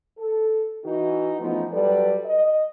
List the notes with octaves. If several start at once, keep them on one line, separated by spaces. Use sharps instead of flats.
A4
E3 D#4 E4 F#4
E3 F3 A3 B3 C#4 D#4
F#3 G3 A4 B4 D5
D#5